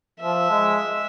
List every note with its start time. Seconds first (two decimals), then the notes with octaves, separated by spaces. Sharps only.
0.19 F3 E5
0.51 G#3